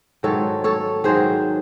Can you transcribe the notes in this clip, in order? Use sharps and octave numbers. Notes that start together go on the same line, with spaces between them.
G#2 D#3 F#3 A4 C#5
A4 C#5
G#2 D#3 F#3 G#4 C5